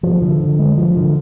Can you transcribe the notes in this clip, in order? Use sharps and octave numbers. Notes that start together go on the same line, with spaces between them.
F3
D3
D3
G#3
F3
D3